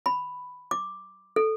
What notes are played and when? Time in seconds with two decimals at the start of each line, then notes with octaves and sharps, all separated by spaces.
0.06 B5
0.71 D6
1.36 A4